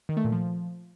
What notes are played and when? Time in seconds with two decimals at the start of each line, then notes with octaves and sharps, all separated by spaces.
0.09 D#3
0.17 A3
0.25 A#2
0.32 F3